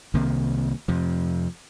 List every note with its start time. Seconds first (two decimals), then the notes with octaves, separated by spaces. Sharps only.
0.14 C2 C3 D#3 A#3
0.88 F2 C3 F3